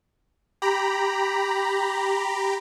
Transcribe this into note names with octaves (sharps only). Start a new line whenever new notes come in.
G4 A#5 B5